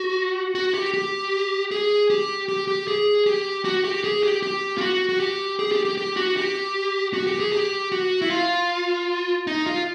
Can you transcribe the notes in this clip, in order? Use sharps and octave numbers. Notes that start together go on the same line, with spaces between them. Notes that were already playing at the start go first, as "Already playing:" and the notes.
Already playing: F#4
F#4
G4
G4
G#4
G4
G4
G4
G#4
G4
F#4
G4
G#4
G4
G4
F4
F#4
F#4
G4
G#4
G4
G4
G4
F#4
G4
F#4
G4
G#4
G4
F#4
E4
F4
D#4
F4